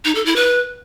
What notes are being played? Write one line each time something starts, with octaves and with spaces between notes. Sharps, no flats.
D#4
A4
E4
B4